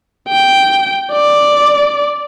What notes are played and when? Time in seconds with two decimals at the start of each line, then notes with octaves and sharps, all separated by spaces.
0.29 G5
1.13 D5